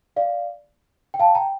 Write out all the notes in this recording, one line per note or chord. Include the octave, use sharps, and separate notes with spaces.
D5 F5
G5
F5 A5
G5 A#5